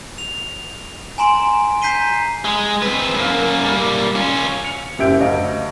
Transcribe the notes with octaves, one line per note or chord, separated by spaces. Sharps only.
F7
G#5 A#5 C6 D7 E7
A#5 G6 B6 C7 D#7 G7
G#3
C4 B4
F#2 A#3
G3 A#3
C#4 F4
C#7 F7
F#1 F#2 G4 E5 G6 D7
D2 D#5 F5